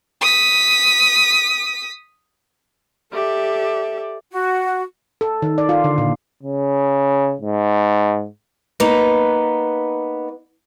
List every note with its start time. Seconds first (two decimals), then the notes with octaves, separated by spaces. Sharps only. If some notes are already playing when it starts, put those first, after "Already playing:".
0.21 D#6 B6
3.12 G4 A4 D5 E5
4.31 F#4
5.21 A4
5.42 D#3
5.58 D5
5.69 F4
5.84 D3
5.98 A#2
6.43 C#3
7.41 G#2
8.80 A#3 B3 D#4 B4